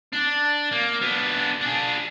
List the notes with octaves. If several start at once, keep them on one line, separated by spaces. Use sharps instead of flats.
D4
A#3
B3 D4
D4 G#4